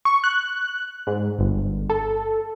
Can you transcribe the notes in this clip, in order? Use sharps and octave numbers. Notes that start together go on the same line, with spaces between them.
C#6
F#6
G#2
G1
A4